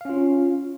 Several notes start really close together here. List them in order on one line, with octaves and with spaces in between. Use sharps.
F5 C#4 F4